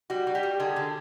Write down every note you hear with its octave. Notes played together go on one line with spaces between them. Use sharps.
G3 F#4
G3
G4
G3
D3 G#4
D3